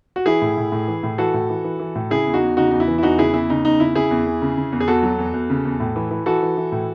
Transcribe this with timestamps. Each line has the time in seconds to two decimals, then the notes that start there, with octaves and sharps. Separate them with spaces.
0.16 F#4
0.26 E3 E4 G#4
0.42 A2
0.57 A2
0.72 A2
0.88 E3
1.03 A2
1.18 E3 F#4 A4
1.34 A2
1.50 E3
1.64 E3
1.80 E3
1.95 A2
2.11 C#3 E4 G#4
2.27 E2
2.34 D#4 F#4
2.42 E2
2.57 C#3 D#4 F#4
2.71 E2 D#4
2.80 E4
2.88 E3
2.98 E4
3.03 E2 D#4 F#4
3.18 C#3 E4 G#4
3.34 E2 E4
3.49 C#3 D#4
3.64 E2 D#4
3.80 C#3 E4
3.95 C#3 E4 G#4
4.11 E2
4.26 E2
4.42 C#3
4.57 C#3
4.72 E2
4.81 G#4
4.88 E2 F#4 A4
5.03 F#3
5.18 E2
5.34 E2
5.50 C#3
5.65 E2
5.80 A2
5.96 E3
6.11 E3
6.26 E3 F#4 A4
6.42 E3
6.57 E3
6.72 A2